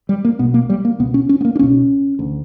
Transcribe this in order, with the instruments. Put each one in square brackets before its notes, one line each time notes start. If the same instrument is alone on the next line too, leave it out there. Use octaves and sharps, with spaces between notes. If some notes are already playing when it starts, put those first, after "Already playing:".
[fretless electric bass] G3
A#3
B1 B2 B3
A#3
G3
A#3
C#2 B2 B3
C#4
C#4
B3
A#3
D4
C#2 B2 C#4
D2 D3